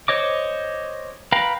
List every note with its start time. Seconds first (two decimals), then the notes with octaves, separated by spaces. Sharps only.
0.08 C5 C#5 D#5 D6
1.32 B4 F5 G5 A#5 B5